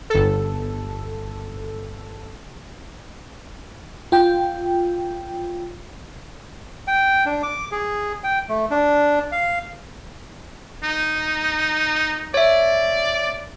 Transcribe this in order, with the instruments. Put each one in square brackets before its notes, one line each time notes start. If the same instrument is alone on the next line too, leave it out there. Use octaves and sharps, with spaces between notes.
[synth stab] G1 A4
[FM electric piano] F4 G5
[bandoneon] G5
D4
D6
G#4
G5
A3
D4
F5
[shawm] D#4
[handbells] C#5 E5 [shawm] D5